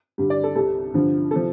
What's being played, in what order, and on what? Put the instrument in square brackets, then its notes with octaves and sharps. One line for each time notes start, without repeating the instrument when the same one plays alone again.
[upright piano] G2 D3 G3
D5
A4
C2 C3 G3 A4
G2 D3 F3
C3 F3 A4